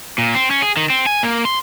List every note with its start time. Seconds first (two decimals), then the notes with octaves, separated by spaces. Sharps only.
0.18 A#2
0.35 C4
0.51 C#4
0.62 G#4
0.77 D#3
0.90 C4
1.06 G#5
1.23 A#3
1.45 C6